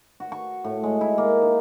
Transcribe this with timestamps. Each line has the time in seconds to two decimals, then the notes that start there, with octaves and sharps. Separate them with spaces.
0.20 F#4
0.32 C#6
0.64 A2
0.83 G#3
1.01 E4
1.18 A#3
1.42 D#4